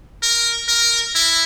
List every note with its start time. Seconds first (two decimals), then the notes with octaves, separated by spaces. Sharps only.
0.23 A#4
0.68 A#4
1.15 E4